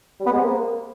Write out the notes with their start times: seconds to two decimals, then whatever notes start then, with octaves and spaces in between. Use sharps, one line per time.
0.20 G3
0.26 B3
0.32 G#3
0.38 C4
0.44 A#3